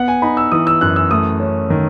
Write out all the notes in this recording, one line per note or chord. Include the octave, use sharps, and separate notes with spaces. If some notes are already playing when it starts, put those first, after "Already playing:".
Already playing: B3 F#5
G#5
D#4 B5
E6
E3 D#6
E6
F#2 F#6
E6
A3 D#6
C#4
D#3